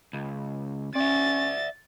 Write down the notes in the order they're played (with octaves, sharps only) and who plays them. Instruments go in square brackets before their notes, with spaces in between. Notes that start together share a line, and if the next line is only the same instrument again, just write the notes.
[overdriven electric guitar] C#2
[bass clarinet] C#4 [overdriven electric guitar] D5 E5 [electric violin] A6